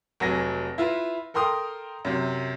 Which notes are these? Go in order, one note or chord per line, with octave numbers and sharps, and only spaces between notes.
F1 F#3 G#5 A#6
E4 F4 B4
A4 A#4 G5 C6 D#6 F6
F#2 C3